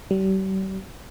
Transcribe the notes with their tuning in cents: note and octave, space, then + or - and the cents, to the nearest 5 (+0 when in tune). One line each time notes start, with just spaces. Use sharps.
G3 -40